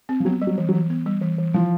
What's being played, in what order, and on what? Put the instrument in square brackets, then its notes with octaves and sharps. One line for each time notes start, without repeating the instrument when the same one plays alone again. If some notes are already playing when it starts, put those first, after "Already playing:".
[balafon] C4
[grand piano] F3
[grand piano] F#3 [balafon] B3
[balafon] G3
[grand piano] F#3
[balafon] E3
[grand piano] F#3
[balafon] E3
B3
G3
E3
E3
[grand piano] F3 [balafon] E4